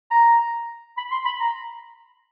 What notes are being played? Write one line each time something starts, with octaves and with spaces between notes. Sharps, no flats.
A#5
B5
C6
B5
A#5